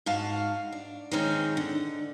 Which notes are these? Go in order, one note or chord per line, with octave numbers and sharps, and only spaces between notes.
G#2 F#4 F5 A5
D4
D#3 G#3 C4 C#4 D#4
D3